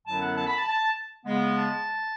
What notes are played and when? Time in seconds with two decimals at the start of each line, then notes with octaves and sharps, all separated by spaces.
0.06 F#2 D3 F#3 B3 E4 A5
0.22 F#5
0.36 A5
0.47 B5
0.57 A5
0.67 A5
1.25 C#3 G#3 B3
1.56 A5